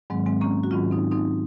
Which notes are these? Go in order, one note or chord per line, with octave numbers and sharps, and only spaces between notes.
G#2 D#3 F#3 G#3 C4
G#3 C4
A#3 C#4
F#4
G#2 D#3 F#3 C#4 F4
C4 D#4
C4 D#4